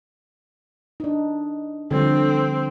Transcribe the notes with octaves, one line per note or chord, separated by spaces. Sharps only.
D4 D#4
D3 F3 G3 C4